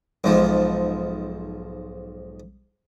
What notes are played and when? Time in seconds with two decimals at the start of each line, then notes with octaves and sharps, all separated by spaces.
0.24 B1 G#2 F3